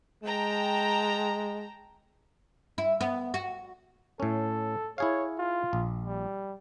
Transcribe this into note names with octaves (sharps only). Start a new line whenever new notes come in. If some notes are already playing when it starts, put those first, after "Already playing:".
G#3 G5 A5 A#5
E4
B3
F#4
A2 C#4 A4
E4 G#4 C#5 F5
F4
A#1
G3